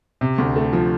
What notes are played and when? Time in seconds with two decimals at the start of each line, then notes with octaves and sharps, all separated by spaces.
0.21 C3
0.38 D2
0.56 A3
0.73 F3